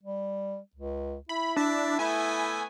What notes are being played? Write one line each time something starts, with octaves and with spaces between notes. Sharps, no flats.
G3
C#2
E4 B5
D4 E5 A5
A3 B3 E5 G#5